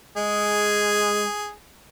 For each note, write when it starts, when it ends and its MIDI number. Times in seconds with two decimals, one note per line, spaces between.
0.17 1.25 56
0.17 1.50 68